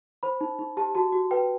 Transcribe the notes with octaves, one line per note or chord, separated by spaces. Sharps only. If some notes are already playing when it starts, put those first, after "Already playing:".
C5 B5
D#4
D#4
G4 A5
F#4 A5
F#4
B4 G5